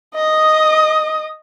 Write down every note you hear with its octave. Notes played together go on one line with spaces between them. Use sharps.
D#5 D#6